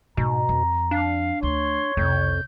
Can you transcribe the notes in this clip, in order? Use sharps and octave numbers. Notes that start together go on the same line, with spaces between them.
G#2 B2 A#5
F2
D4 F5
D2 C#5 C6
C2 F2 C#3 G6